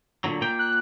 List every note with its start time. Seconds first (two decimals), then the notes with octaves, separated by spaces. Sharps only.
0.24 A#2 D3 F#3
0.41 A#2 A#3 G5
0.59 F#6